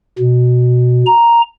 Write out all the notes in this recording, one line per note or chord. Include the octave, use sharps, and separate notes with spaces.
B2
A#5